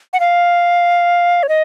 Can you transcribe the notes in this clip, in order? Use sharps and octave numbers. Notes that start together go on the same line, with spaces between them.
F#5
F5
C#5
D#5